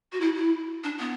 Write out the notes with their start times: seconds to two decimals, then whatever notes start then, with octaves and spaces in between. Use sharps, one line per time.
0.12 F#4
0.21 E4
0.36 E4
0.84 D4
0.99 B3